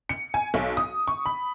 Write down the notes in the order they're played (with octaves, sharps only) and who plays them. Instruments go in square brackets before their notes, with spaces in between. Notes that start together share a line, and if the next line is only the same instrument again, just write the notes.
[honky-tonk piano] C#7
G#5
B1
D#6
C#6
B5